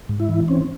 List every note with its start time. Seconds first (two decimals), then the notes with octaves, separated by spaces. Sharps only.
0.09 G#2
0.20 E4
0.29 E3
0.48 C4 C#4